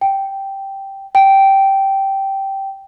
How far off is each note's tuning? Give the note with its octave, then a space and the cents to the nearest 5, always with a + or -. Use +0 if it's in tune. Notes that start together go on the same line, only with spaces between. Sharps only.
G5 -5
G5 -10